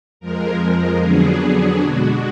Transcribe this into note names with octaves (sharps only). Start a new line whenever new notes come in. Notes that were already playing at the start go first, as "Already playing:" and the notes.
F2 F3 G#3 A#4
F2 D3 F#3 B3 D4 G#4
B2 G#3 D4 F#4